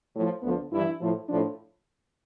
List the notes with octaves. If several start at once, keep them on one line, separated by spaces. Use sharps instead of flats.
A2 F3
D2 D3 F3 B3
G2 E3 E4
A2 F3
A2 F3 D4